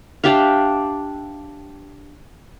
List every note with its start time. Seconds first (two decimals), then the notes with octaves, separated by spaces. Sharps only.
0.24 D4 G4 E5 F5